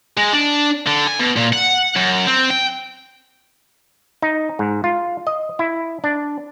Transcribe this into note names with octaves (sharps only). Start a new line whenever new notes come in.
G#3
D4
D3
G#5
B2
A#2
F#5
F#2
C4
G5
D#4
G#2
F4
D#5
E4
D4